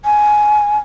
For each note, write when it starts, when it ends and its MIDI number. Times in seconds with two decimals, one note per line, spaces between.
0.05 0.78 80